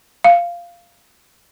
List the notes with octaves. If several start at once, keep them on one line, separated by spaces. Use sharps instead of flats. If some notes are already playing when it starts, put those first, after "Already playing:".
F5